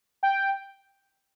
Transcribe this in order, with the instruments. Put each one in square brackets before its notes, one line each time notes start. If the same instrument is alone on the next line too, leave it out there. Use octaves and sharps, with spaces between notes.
[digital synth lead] G5